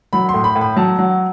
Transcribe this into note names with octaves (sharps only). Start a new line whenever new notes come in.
F#3 B5
C6
A2
B5
A2
B5
F#3 A5
F#3